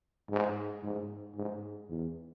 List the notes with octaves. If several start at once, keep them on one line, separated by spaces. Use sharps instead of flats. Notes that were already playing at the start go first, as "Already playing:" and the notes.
G#2
G#2
G#2
E2